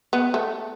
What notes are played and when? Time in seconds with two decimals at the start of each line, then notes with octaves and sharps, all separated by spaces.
0.13 B3
0.34 A3